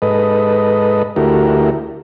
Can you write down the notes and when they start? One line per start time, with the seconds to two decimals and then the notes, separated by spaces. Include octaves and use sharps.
0.02 G#2 A4 B4 D#5
1.16 D2 A3 E4 F#4 G4 A#4